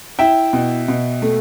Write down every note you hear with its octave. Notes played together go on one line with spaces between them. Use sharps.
E4 E5 G5
B2
B2
A3